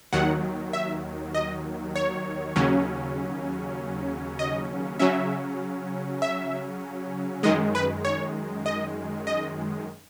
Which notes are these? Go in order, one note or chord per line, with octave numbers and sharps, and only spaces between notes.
D#2 D#3 F#3 F#5
E5
D#5
C#5
D#2 C#3 F#3 C#4
D#5
C#3 F#3 C#4 E5
E5
F#2 D#3 G#3 D#5
B4
C#5
D#5
D#5